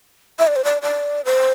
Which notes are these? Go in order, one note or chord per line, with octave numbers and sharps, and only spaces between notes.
E5
D5
C5
D5
D5
C5